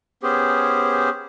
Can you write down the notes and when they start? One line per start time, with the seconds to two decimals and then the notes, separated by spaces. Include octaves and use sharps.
0.23 B3 C#4 G4 G#4 C5